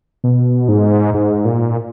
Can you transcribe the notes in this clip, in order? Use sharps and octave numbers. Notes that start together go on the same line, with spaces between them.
B2
G#2
G#2
A#2